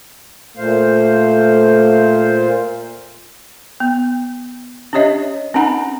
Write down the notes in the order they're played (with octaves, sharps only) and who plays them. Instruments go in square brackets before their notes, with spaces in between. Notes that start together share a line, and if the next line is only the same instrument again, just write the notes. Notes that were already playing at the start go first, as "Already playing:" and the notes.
[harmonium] A#2 C5 F5 [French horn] A3
[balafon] B3
C#4 D4 G4 C#5 D#5 E5
C4 C#4 D#4 F#5 A#5 B5